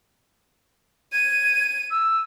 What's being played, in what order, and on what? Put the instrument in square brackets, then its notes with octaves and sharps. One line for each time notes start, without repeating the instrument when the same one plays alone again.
[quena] G#6 [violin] D#7
[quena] E6